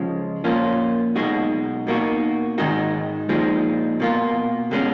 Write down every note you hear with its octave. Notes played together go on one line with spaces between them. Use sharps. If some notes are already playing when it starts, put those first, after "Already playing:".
Already playing: C#2 C#3 F3 G#3
A#2 F3 A#3 C#4 F4
B1 B2 G#3 D#4 F#4
B2 A#3 D#4 F#4
G#2 D#3 G#3 D#4 F#4
A#2 F3 G#3 D#4
B2 A#3 F4
B2 G#3 C#4